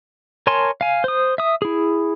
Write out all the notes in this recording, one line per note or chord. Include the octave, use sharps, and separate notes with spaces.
A#4 C#5 G#5 A5 C6
F5 G#5
C5 D#6
E5 D#6
E4 G#4